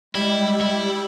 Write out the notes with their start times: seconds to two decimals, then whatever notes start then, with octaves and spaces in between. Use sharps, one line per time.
0.15 G3 G#3 E4
0.61 E4